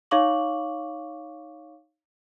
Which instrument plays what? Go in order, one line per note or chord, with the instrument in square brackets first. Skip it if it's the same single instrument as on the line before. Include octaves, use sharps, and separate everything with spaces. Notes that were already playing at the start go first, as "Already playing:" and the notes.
[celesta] D#4 C#5 F5 C#6 D6 F#7